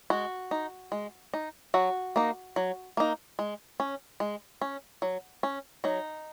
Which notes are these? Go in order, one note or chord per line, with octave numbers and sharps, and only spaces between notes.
G#3 F#4
D#4
G#3
D#4
F#3 F#4
A#3 D#4
F#3
A#3 D#4
G#3
C#4
G#3
C#4
F#3
C#4
F#3 D#4